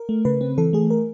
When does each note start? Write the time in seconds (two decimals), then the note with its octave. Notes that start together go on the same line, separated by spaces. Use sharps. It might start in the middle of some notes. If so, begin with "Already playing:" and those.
Already playing: A#4
0.09 A3
0.25 C#3 B4
0.41 C4
0.58 E3 A4
0.73 A3 G#4
0.90 A#4